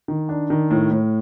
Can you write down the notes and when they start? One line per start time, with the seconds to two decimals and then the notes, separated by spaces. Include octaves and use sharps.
0.08 D#3
0.29 D4
0.50 D#3
0.71 A2
0.91 A2